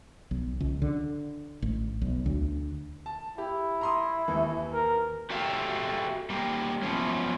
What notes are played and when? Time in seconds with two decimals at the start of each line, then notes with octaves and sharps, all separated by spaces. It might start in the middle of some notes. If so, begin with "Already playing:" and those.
0.31 B1
0.60 C#2
0.82 D3
1.62 A1
2.02 B1
2.26 D2
3.06 A5
3.38 E4 G4
3.81 A#5 C6 D#6
4.28 D#2 E3
4.73 A#4
5.30 F#4 G4 A4 E5 F5
6.30 G3 A#3
6.83 F#2 A#2 F3 B3 C#4